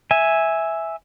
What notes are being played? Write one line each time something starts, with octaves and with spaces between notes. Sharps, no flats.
E5 G#5